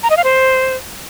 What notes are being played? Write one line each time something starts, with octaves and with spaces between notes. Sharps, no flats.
A#5
D#5
F5
C5